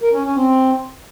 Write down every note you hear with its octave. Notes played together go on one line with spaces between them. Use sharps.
A#4
C#4
C#4
C4